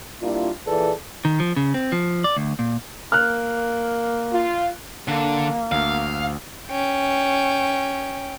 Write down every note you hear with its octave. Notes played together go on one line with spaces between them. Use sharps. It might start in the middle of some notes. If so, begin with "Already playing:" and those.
G3 A#3 D4 E4 F4
A#2 E3 G#4 A4 B4 D5
D#3
F3
C#3
C4
F3
D5
D2
A#2
A#3 F6 F#6
F4
D3 A#3
D2 F5
C#4 G5